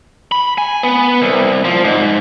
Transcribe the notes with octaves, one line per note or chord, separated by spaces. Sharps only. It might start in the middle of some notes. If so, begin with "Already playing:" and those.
B5
G#5
B3
C2
F3
G#2